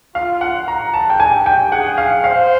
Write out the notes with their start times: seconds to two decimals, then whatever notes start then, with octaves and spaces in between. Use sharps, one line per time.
0.15 F4 F5
0.41 F#5
0.68 A#5
0.94 A5
1.10 G5
1.19 G4 G#5
1.46 G5
1.72 G#4 F#5
1.98 F5
2.23 C5 F5